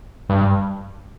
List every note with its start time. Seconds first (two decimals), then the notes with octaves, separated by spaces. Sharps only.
0.30 G2